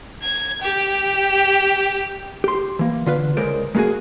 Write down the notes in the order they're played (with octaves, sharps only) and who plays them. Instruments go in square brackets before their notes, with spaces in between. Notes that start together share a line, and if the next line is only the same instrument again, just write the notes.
[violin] G#6
G4
[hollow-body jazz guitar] G4 C6
E3 A#3
D3 F4 B4
C#2 G#3 A#4 C5 D5
G#3 A#3 F4 F#4 G#4